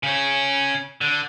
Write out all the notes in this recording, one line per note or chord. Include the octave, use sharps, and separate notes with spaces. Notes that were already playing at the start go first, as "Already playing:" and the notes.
C#3 C#4
D3